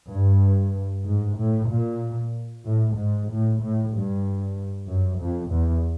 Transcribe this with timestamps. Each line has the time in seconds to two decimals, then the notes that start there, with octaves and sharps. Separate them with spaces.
0.11 G2
1.06 G#2
1.39 A2
1.71 A#2
2.66 A2
2.98 G#2
3.29 A2
3.61 A2
3.93 G2
4.88 F#2
5.19 F2
5.51 E2